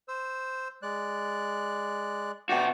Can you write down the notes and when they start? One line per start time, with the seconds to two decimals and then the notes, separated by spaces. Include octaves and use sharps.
0.08 C5 E6
0.82 G#3 D5 F#6
2.49 C3 F#4 D5 G5 D6